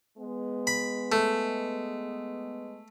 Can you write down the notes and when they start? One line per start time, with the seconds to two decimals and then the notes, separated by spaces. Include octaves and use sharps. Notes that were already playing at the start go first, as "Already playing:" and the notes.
0.18 G#3 B3
0.67 B5
1.12 A3